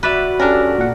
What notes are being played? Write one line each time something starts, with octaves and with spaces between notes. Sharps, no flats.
F#4 B4 D5 E5
C#4 D4 G4 A4 A#4
A#2 F#5